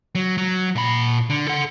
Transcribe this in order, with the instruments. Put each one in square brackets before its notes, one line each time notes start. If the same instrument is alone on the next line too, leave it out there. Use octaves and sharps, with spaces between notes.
[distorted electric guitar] F#3
F#3
A#2 B5
D3
A4 F#5